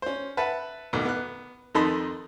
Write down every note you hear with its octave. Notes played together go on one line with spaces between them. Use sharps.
C#4 C5
B4 E5 F#5 A5
A1 D#2 B2
B3 F#6
F2 D#3 D#4 A5 B5 C6